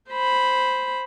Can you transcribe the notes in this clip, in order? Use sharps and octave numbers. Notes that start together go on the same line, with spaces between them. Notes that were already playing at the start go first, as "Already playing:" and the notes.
C5 B5